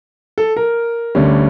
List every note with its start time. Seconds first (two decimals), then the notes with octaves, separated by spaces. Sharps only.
0.38 A4
0.57 A#4
1.15 D2 D3 G3 C#4